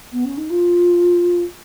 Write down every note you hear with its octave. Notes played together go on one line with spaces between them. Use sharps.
B3
C#4
D#4
F4